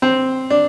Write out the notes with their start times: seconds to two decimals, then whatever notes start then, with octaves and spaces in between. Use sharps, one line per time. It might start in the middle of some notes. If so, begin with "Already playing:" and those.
0.02 C4
0.50 D4